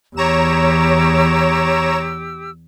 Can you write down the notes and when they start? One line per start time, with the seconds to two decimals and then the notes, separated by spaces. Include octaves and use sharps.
0.16 E2 G4 C#5 A#5 E6 E7